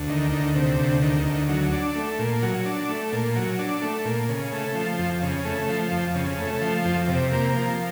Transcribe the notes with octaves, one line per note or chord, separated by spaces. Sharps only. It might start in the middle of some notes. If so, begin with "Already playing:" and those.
Already playing: D2
D#3
D2
C3
D2
D#3
D2
F#3
D4
A3
A#2
F#3
D4
A3
A#2
F#3
D4
A3
A#2
C#3
A3
F3
F2
C#3
A3
F3
F2
C#3
A3
F3
F2
C3
A#3
F3